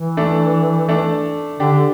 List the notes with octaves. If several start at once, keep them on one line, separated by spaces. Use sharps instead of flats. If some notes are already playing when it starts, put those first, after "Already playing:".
Already playing: E3
A3 D4
A3 D4
D3 D4 G4